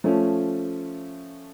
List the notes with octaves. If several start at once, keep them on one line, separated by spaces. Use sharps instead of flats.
F3 A3 C#4